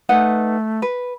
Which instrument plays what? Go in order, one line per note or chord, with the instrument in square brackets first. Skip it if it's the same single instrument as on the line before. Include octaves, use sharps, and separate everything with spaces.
[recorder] A3 [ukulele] D#4 B4 F#5
[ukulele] B4